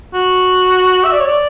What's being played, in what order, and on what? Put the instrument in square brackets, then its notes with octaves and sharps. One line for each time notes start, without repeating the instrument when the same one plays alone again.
[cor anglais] F#4
E5
D5
C#5
D5